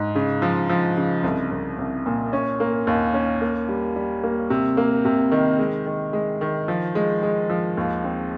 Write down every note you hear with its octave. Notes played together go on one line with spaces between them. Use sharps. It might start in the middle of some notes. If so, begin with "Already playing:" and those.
Already playing: G#2
C#3
F3
F3
C#3
C2
C2
C2
A#2
C#4
A#3
D#2
C#4
A#3
G3
G3
A#3
C3
A#3
C3
D#3
G#3
D#3
G#3
D#3
F3
G#3
G#3
F3
D#2
C4